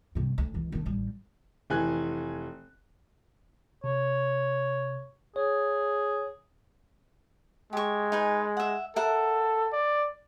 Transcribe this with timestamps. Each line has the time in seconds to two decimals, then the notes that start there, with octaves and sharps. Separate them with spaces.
0.15 G2 C3
0.38 D2
0.54 C#2 E3
0.72 D#3 D4
0.85 A1 G3
1.70 F1 E3 G#5 F#6
3.84 C3 C#5
5.36 G#4 C#5
7.73 G#3 G4 C#6
8.12 D#4 B4 G#5
8.57 E5 F#5
8.96 A4 A#4 E5 F#5
9.73 D5